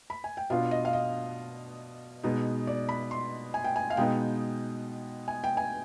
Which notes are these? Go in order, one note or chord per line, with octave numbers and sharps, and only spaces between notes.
B5
G#5
G5
B2 B3 D4 F4 F5
D#5
F5
D#5
B2 G#3 B3 D#4
D5
B5
C6
G#5
G5
G#5
F5
B2 G#3 B3 D#4 G5
G#5
G5
G#5